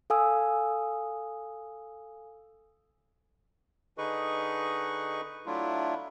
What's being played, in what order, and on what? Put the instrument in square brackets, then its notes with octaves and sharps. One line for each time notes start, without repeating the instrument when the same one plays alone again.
[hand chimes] A4 F5 G#5 D#6 E6
[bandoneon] D3 D#4 G#4 B4 D#5 C#6
F#3 A3 D4 E4 F4